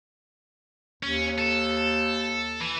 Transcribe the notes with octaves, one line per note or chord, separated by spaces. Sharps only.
D#2 C#4
A4
E3